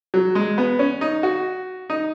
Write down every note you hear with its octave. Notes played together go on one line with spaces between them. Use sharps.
F#3
G#3
B3
C#4
D#4
F#4
D#4